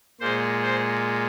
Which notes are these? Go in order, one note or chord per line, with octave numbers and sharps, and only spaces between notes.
A#2 G#3 C5
C5